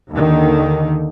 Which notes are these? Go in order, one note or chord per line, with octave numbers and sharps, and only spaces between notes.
D#2 D3 D#3